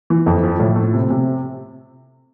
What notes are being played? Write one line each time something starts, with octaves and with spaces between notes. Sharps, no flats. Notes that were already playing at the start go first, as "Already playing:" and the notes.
E3
F2
F3
A2
A3
C3
C3